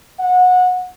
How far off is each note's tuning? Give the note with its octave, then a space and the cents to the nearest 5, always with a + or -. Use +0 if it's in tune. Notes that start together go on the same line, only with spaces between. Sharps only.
F#5 -25